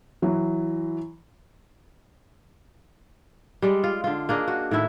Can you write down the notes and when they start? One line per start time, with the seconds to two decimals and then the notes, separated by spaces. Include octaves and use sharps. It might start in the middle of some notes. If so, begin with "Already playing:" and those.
0.22 E3 F#3
3.62 G3 G#3 D5
3.84 F4
4.04 D3 F4
4.29 A#3 D4 G#4 D#5
4.48 F#4
4.71 A2 D#3 E4 E5